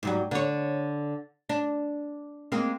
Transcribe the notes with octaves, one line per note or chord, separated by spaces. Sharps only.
G#2 F#3 G3
D3 C#5
D4
G#3 A#3 C4